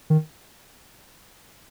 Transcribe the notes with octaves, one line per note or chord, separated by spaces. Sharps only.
D#3